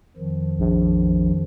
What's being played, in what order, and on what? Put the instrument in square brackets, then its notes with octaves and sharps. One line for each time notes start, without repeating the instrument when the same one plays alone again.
[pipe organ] F2 D#3 F3
[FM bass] A#1